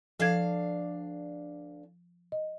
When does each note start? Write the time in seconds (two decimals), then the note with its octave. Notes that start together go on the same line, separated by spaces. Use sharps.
0.20 D2 F3 D4 A4 F5 G#6
2.32 D#5